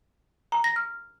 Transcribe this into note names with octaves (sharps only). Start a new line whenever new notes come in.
A#5
A#6
F6